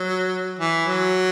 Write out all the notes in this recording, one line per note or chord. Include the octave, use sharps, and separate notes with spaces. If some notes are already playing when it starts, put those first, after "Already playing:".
Already playing: F#3
E3
F#3